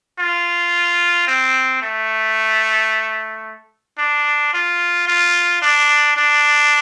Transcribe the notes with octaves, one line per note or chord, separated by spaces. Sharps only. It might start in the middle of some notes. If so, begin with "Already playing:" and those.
F4
C4
A3
D4
F4
F4
D4
D4